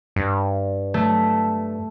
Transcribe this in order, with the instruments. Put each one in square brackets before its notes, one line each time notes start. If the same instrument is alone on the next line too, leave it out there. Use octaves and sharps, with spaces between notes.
[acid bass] G2
[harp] A3